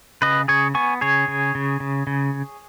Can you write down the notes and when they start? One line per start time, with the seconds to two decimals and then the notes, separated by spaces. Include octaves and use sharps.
0.22 C#3 B4 D#5
0.48 C#3 G#4 C#5
0.75 B3 G#5 C#6
1.01 C#3 G#4 C#5
1.28 C#3
1.55 C#3
1.80 C#3
2.07 C#3